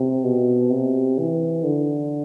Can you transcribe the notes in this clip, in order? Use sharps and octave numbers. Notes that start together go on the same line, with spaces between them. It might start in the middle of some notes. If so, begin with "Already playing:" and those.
Already playing: C3
B2
C3
E3
D3